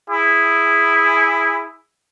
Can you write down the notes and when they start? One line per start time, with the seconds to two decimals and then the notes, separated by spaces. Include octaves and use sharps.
0.10 E4 G#4